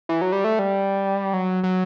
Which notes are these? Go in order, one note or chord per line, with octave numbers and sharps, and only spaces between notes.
E3
F#3
G3
A3
G3
F#3
F#3